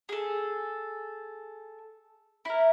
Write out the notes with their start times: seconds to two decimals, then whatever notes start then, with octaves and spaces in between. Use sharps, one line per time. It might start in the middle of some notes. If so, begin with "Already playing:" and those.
0.09 G#4 A4
2.45 E4 A#4